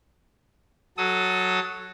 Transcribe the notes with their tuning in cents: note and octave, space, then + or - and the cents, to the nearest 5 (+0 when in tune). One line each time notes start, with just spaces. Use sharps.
F#3 +0 A4 +0 D#6 +30